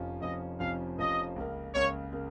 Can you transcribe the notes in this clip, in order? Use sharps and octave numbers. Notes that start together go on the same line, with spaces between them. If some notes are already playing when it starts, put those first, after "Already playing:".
Already playing: F1 F2 F3 C#4 F4
F1 F2 F3 C#4 F4 D#5
F1 F2 F3 C#4 F4 F5
F1 F2 F3 C#4 F4 D#5
C#2 C#3 A#3
C#2 C#3 A#3 C#5
C#3 A#3